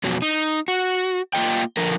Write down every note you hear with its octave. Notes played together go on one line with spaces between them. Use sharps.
F2 B2 F#3
D#4
F#4
A#3 F4 D#5 G5
D3 F3 A#4